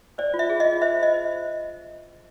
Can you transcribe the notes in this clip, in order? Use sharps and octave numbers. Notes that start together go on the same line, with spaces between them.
C5 D5
F4
E5
G#4
D#5
F4
C5 E5
F4
D#5
C5